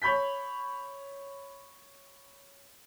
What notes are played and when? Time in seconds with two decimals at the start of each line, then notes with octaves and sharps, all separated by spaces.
0.02 C#5 B5 G6 B6